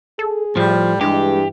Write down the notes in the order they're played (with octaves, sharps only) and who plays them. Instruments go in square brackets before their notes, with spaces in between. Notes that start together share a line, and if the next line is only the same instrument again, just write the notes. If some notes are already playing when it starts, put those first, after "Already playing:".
[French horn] G#4 [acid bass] A4
[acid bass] A2 [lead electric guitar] F3 [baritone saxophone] G3
[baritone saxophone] G2 [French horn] E3 [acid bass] G#3 [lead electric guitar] G4